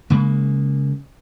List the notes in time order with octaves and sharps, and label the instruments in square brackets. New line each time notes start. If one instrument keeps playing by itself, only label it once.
[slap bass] C#3 G#3 A#3